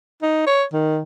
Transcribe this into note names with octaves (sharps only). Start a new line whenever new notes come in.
D#4
C#5
D#3